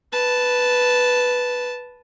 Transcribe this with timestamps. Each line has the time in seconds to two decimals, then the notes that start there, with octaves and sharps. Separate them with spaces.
0.12 B4 A5